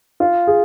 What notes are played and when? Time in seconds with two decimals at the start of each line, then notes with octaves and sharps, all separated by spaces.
0.20 F4
0.47 G#4